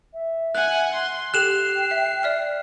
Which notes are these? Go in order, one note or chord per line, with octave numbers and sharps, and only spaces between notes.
E5
F#5 G#5 F#6
C6
G4 A4 G5 F#6 C7 E7 F7
E5
D5 E5 F6